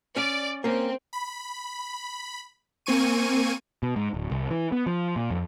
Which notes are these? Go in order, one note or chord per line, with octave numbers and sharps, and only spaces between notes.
C#4 D5
A#3 C4 C#4
B5
A#3 C4 G#5 C#6 D#7
B2
G#2
D1
C2
E3
B3
F3
A#2
F2